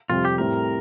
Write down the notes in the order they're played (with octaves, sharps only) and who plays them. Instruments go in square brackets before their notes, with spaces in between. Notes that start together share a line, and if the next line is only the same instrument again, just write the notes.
[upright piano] F2 C3 G3 [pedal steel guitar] F4
[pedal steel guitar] G4
[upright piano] A2 G3 C4 [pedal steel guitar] A#4